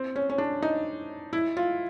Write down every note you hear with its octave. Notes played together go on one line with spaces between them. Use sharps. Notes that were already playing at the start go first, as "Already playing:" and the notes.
Already playing: C4
C#4
C#4
D4
D#4
E4
F4